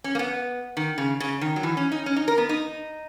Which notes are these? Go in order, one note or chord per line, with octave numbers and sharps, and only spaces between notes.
C#4
A#3
B3
D#3
C#3
C#3
D#3
F#3
E3
C#4
D#4
C#4
D#4
A#4
B3
D#4